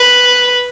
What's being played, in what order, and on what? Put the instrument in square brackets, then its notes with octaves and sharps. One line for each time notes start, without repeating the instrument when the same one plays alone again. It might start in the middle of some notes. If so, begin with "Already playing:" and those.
Already playing: [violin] B4